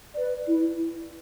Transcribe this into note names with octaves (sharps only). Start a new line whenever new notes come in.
B4 D5
E4